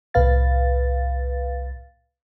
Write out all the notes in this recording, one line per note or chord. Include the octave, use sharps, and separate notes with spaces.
C2 A2 B4 F5 A6